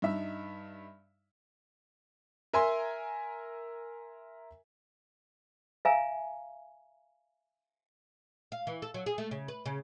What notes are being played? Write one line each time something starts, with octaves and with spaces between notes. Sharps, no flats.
G2 D#4 E5
A#4 E5 G#5 A#5 C6
E5 F5 G#5 A#5
F5
E3
A4
F#3
G#4
A3
C#3
B4
C#3